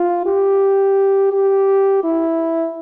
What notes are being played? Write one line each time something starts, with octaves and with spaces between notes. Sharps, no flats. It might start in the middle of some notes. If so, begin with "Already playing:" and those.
Already playing: F4
G4
G4
E4